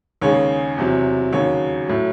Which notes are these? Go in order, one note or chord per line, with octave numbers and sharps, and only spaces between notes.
D#2 C#3 G#3 C#5
E2 C3 F#3
D#2 C#3 F#3 C#5
A2 F#3